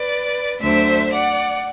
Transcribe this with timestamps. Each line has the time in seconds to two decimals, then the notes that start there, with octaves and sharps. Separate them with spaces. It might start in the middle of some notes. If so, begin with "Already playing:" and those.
Already playing: B4 D5
0.61 D2 D3 F#3 C5 E5
1.12 D5 F#5